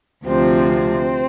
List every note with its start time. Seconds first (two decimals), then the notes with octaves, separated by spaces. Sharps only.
0.25 D2 C3 F3 C4
0.71 C4